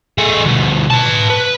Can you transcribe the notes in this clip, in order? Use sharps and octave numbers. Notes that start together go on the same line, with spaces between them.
A3 G#4
D2 B2
B4 A5
B4